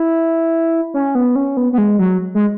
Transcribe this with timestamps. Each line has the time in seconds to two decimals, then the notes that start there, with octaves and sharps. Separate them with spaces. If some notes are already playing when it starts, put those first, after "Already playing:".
Already playing: E4
0.94 C#4
1.15 B3
1.36 C#4
1.57 B3
1.73 B3
1.78 G#3
1.99 F#3
2.35 G#3